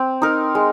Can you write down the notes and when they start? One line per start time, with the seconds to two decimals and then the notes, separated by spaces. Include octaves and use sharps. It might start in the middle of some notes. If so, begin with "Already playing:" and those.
Already playing: C4
0.22 D#4 A#4
0.55 G#3